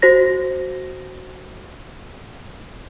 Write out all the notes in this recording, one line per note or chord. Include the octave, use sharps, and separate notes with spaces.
F#4 C5 A#6